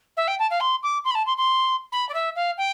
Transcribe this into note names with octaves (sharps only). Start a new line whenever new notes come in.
E5
G5
A5
F5
C6
D6
C6
B5
A5
C6
C6
B5
D5
E5
F5
G5